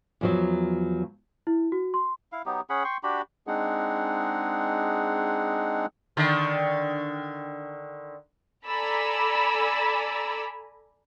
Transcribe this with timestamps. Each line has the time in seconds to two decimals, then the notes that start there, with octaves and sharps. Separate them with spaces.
0.21 E2 F3 F#3
1.47 E4
1.72 F#4
1.94 C6
2.32 E4 F5
2.46 F#3 B3 D#4 G4
2.70 C#4 G#4 F#5 B5
2.84 G5 C6 C#6
3.03 D4 F#4 G4 B5
3.47 G#3 C4 D4 D#4 G#4 F#5
6.17 D3 D#3
8.68 A4 D5 G#5 A#5 B5 E6